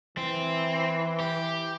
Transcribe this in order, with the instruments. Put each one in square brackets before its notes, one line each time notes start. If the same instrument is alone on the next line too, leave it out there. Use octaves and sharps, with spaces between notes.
[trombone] E3 [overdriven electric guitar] C4
[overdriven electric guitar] G4